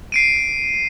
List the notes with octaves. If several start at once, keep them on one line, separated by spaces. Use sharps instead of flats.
C7 D7 D#7